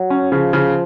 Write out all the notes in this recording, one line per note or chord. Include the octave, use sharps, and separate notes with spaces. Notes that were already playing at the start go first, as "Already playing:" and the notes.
Already playing: F#3
C#4
C#3 F3
C#3